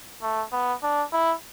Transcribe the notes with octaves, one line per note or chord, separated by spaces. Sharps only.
A3
B3
D4
E4